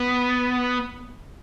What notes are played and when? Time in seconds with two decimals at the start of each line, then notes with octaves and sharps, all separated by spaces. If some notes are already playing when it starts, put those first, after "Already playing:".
Already playing: B3